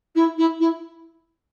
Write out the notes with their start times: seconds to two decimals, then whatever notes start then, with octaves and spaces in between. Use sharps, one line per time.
0.15 E4
0.37 E4
0.60 E4